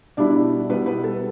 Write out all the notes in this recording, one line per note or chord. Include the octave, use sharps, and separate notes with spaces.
B2 G3 D4 E4 D5
B2 G3 B3 E4 B4
B3 B4
A4